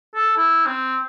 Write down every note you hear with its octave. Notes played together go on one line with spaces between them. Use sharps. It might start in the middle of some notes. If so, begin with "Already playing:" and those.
A4
E4
C4